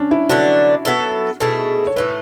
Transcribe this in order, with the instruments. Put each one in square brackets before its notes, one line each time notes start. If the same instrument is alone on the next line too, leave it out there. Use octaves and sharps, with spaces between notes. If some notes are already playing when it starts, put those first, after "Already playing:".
Already playing: [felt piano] C#4 D4
E4
[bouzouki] D3 F#3 B3 D4 [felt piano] F#4
[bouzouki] F#3 B3 E4 A4
[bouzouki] B2 A3 E4 G#4 [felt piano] A4
[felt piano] C#5
[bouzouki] A2 E3 A3 [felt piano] B4